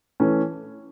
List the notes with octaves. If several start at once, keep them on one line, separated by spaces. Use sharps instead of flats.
E3 A3 C#4